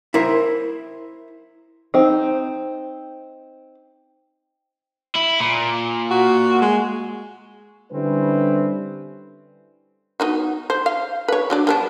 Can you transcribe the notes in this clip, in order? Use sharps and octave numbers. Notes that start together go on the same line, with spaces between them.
E4 A#4 C5
C4 D#4
E4
A#2
F#4
G#3
D3 G3 C4 C#4 E4 B4
B3 D#4 F#4
C5
F5
B4 C#5
F#3 D4 D5
G3 B3 D4